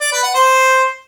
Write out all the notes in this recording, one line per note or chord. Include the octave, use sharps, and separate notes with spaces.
D5
B4
F#5
C5